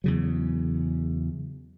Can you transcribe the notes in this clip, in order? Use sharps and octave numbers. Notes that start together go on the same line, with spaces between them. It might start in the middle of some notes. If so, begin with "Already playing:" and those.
E2 C#3 F#3